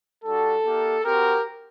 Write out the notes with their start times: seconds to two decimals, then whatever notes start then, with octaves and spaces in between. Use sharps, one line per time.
0.24 G3 D4 F#4 A4
0.65 A#3 D#4 G4
1.04 C4 F#4 G4 A#4